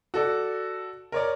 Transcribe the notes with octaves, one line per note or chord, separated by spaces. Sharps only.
F#4 A4 D5
A#4 C#5 D5